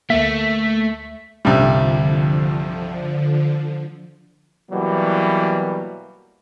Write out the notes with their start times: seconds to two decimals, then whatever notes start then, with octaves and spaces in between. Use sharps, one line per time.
0.10 D2 A3 A#3 E5 B6
1.45 C2 G2 D3 F3 G3
4.71 B2 E3 F#3 G3 A#3